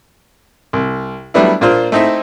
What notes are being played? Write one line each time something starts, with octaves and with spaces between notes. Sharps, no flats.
C2
F#3 G3 A3 B3 D4 E4
A#2 A#3 D4 F4 C5
A3 C4 D#4 E4 E5